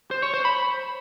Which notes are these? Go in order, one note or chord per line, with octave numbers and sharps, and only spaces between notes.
C5
C#5
C5
B5